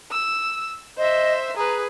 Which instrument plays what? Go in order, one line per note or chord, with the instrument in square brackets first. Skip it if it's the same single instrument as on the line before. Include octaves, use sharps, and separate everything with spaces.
[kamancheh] E6
[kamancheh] C5 E5 [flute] D#5
[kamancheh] G#4 B4 [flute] A#5